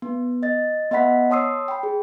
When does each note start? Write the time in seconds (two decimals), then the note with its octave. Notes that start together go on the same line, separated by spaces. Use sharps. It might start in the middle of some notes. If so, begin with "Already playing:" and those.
0.02 B3
0.43 D#5 A6
0.91 B3 D#5 E5 F#5 B5 B6
1.30 C#5 A5 C6 D#6 E6 C7
1.68 G5 B5
1.83 G#4